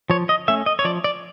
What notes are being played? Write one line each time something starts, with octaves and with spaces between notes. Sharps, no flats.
F3 C#5
D#5
A3 C#4 E5
D#5
C#5
F3 D5
D5